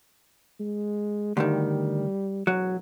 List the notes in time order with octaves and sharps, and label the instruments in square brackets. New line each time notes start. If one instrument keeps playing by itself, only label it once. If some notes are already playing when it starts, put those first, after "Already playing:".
[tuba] G#3
[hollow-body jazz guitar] D2 G2 D#3 [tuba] G3
[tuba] E1 [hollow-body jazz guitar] F#3